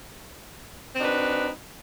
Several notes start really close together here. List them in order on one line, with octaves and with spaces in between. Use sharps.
C4 D#4 F#4 D4 B4